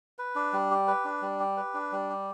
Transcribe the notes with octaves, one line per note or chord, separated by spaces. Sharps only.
B4
D4
G3
G4
B4
D4
G3
G4
B4
D4
G3
G4